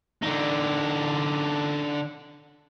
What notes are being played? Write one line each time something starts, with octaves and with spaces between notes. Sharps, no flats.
D3 D#4